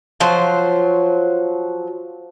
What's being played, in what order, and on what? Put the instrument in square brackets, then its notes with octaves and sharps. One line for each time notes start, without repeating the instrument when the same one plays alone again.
[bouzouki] F3 F#3 C5